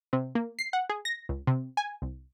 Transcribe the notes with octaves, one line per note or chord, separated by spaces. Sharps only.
C3
A#3
C7
F#5
G#4
A#6
C#2
C3
G#5
C2